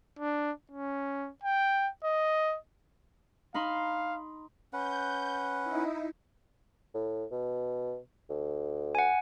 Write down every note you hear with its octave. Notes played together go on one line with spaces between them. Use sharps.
D4
C#4
G5
D#5
D#4 F5 B5 C6
C#4 B4 F#5 G6
D#4 E4
A2
B2
D2
F#5 G#5